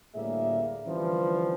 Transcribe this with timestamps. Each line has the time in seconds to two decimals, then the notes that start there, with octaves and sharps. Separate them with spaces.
0.14 D2 A2 G3 A#3 G#4 E5
0.86 D3 E3 F3 G3 C4 C#4